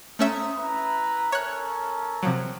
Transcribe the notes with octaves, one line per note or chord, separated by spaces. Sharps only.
A3 C#4 C5 E5 A#5 D#6
E4 B4 A#5
C#4 A4 A#4 C#5 F#6
C3 F3 F#3